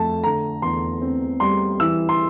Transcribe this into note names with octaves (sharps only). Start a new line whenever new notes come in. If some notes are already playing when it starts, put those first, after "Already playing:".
Already playing: F2 A3 A5
D3 A#5
E2 C6
C4
G3 C6
E3 E6
C6